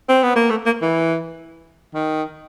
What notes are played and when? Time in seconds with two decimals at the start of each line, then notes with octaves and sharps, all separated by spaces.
0.09 C4
0.23 B3
0.36 A#3
0.50 A3
0.66 A#3
0.82 E3
1.94 D#3